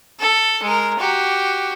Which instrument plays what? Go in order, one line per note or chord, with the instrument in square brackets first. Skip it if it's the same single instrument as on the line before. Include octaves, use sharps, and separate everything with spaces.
[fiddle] A4
G#3 A#4
F#4 G4